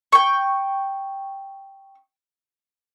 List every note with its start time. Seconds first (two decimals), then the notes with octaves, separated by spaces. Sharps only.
0.12 G5 C#6